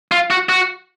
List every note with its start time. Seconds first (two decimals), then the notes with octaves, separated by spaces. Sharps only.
0.12 F4
0.30 F#4
0.49 F#4